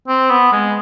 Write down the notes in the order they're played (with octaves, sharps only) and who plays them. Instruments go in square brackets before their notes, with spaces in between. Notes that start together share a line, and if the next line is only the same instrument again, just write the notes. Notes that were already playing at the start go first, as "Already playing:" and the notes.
[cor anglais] C4
B3
G#3